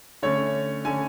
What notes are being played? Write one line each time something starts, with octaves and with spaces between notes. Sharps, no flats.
D3 A3 C#4 C#5
D3 A3 C#4 G#5